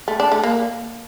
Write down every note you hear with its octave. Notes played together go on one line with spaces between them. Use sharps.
A3
D4
A3
A#3